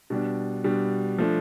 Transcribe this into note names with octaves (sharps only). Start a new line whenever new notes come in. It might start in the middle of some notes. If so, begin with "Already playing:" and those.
B2 G3 D4
B2 G3 D4
F3 A3 D4